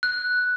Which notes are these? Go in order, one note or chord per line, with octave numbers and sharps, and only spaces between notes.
F#6